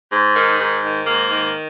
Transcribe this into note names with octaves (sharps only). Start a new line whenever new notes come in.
G#2
D#3
G#2
D#3
G#2 A#3
D#3